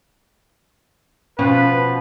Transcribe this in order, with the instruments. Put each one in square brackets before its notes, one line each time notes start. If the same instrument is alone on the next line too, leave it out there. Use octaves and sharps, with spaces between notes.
[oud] B2 F3 [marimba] C#4 [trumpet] B4